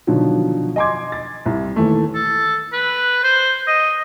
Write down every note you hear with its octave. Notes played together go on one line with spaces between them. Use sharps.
B2 D3 D#3 F3 F#3
D#5 G#5 C6 D6 G#6
A6
C2
D#2 E3 A3
A4
B4
C5
D#5